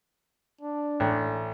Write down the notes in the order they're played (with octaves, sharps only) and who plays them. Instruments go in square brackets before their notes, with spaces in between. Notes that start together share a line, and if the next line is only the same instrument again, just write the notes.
[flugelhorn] D4
[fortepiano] A1